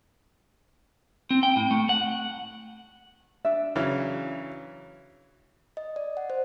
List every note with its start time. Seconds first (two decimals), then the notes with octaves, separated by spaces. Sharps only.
1.31 C4
1.43 G5
1.56 A2
1.71 A3
1.89 F#5
3.45 D4 E5
3.76 C#3 E3 F#3
5.77 D#5
5.96 D5
6.17 F#5
6.30 C5